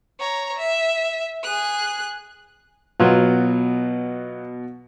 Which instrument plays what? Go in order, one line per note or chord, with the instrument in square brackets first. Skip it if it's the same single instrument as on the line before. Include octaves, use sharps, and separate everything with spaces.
[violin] C#5 A#5
E5
G#4 F#6
[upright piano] B2 B3 [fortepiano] F#3 F4